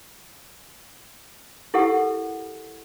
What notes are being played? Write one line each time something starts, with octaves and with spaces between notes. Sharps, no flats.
E4 G4 A4 A#4 F#5